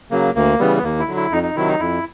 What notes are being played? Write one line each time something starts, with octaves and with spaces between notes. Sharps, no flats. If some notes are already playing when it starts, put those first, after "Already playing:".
C#3 F#3 A#3
D2 A#3
C#3 E3 G3 B3
B3
D#2 A#3
E4
D3 F#3
E4
F2 D#4
D#4
C3 D#3 F#3 E4
D#4
F2 E4